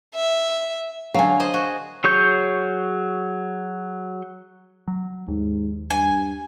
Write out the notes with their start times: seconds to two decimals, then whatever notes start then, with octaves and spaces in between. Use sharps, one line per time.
0.15 E5
1.14 D3 F#3 F5 G#5
1.40 G#4 C5 D#5
1.54 F#4
2.04 F#3 G#4 C#5 C#6 G6
4.88 F#3
5.28 D#2 G#2
5.90 G2 G#5